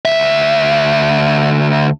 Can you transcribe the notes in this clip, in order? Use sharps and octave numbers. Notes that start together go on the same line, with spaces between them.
D2 E5